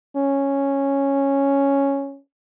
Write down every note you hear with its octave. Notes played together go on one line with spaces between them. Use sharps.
C#4